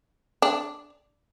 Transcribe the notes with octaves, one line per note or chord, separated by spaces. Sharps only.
D4